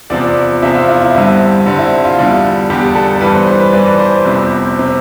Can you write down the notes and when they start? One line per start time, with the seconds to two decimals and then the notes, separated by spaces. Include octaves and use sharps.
0.10 E2 C3 F3 D5
0.62 E2 C3 F3 E5
0.75 F4
0.89 E4
1.01 E4
1.14 G2 D3 G3 C4
1.66 G2 D3 G3 C4
1.79 E4
2.05 F4
2.17 E2 D3 G3
2.70 E2 D3 G3 G4
2.95 A4
3.15 A4
3.21 G2 E3 G3 B4
3.34 C5
3.47 C5
3.60 B4
3.73 G2 E3 G3 D5
3.99 C5
4.25 G1 F2 C3
4.79 C3